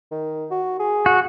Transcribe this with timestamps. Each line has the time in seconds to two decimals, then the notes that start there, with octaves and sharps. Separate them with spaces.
0.12 D#3
0.51 F#4
0.80 G#4
1.06 F#4